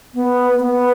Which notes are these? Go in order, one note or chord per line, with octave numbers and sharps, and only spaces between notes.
B3
B3